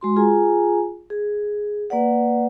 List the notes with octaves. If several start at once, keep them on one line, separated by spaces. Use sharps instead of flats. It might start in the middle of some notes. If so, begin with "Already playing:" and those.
G#3 F#4 C6
F4 G#4 G#5 A#5
G#4
A#3 B4 D5 F#5